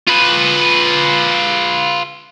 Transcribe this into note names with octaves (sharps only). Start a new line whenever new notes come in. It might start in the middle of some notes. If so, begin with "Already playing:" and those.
F4 B4